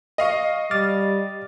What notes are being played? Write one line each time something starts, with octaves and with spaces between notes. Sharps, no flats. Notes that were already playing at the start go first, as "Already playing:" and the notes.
D#5 F5 C#6
G3 D6 F6 A6